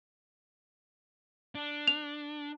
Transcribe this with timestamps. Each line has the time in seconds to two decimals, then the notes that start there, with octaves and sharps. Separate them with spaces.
1.55 D4
1.88 F7